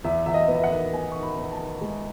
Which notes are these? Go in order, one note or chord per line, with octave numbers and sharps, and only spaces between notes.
E2 E5
E2 E5
D#5
B3
E5
F#5
D#3
B3 G#5
D#3 C#6
B5
B3
A5
D#3
G#3